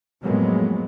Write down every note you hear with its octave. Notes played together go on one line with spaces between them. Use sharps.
F2 A2 F#3 G#3 A#3 B3